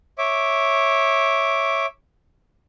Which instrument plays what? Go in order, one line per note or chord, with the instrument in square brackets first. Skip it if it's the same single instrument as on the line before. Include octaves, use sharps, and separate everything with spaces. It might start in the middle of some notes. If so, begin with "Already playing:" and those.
[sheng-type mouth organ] C#5 E5 D6